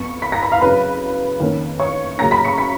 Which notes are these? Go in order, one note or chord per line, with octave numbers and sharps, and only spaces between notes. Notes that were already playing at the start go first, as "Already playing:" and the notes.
Already playing: F2 F3 B3 C#6 C#7
B5 B6
A#5 A#6
B5 B6
F5 F6
F2 C#3 F#3 C#4 B4 B5
F2 D#3 A#3 C#4
C#5 C#6
C#3 F#3 A#3 C#4 A#5 A#6
B5 B6
C#6 C#7
B5 B6